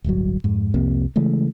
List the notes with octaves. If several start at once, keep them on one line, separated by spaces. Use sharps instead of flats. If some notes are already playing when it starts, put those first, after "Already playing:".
D1 G1 G2 F#3
F2 G#2
C2 F2 C3 A#3
C#3 E3 G#3 A3